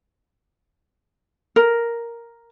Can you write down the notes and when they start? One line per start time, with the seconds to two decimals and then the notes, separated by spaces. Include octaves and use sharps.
1.56 A#4